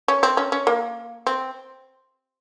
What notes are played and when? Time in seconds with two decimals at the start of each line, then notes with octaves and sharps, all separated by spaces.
0.08 C#4
0.23 C4
0.37 C#4
0.52 C#4
0.67 A#3
1.27 C4